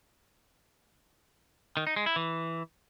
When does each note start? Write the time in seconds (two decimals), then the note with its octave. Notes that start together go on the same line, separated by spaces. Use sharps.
1.77 D#3
1.87 D#4
1.96 G#3
2.06 E4
2.16 E3